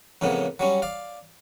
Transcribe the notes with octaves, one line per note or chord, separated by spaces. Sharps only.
F2 A2 C#3 A#3 B3
F#3 G3 C#4
D5 F5